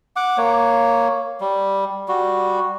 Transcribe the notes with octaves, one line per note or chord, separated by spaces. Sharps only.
F#5 D6
A#3 C#5
G3
G3 F#4